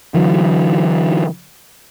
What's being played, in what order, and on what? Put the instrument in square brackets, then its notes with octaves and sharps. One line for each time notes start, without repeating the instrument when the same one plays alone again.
[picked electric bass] D3 E3 F#3